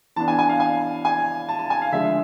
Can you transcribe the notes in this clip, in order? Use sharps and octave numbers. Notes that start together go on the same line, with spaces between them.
E3 B3 D4 A5
G#5
G#5
F5
G#5
G#5
A5
A5
G#5
F5
D3 F3 G#3 E5